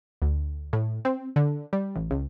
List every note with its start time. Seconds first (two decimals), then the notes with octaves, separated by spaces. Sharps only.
0.22 D2
0.73 A2
1.05 C4
1.36 D3
1.73 G3
1.95 A1
2.11 C#2